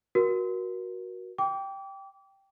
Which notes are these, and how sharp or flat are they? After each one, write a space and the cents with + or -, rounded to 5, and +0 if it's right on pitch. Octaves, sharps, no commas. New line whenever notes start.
F#4 +0 A#4 +30
G5 +0 D6 -30